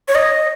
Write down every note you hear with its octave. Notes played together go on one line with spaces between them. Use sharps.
C#5
D#5